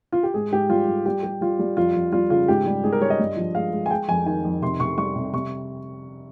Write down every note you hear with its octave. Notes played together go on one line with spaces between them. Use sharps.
F4
G4
G#2 G#4
G#2 G4
G3 F4
G3
G3 G4
G3 G4
G3 F4
G3
F2 F4
F2
G3 F4
C#3 F4
G#2 G4
G3
G#2 G#4
A#4
G3 C#5
D#5
G2
F3
G#3 F5
G#3
G#5
G#3 G5
F2 G#5
D#3 G#5
F2
C3 C6
C3 C#6
G3 C#6
C3
C3 C#6